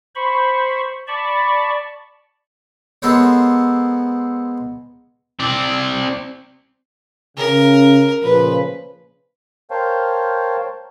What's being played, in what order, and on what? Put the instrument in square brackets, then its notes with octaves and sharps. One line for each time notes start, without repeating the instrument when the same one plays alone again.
[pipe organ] C5 B5 C#6
D5 A5 B5 C#6
[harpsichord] G#3 B3 A4 A#4 C5 C#5
[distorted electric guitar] C4 D5
[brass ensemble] C#3 [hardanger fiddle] A#4
[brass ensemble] A#2 C#3 F3 [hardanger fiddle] B4
[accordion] A#4 C5 C#5 F5 G5 A5